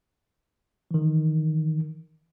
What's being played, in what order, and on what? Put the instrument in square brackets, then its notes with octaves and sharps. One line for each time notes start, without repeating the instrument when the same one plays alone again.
[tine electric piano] D#3 E3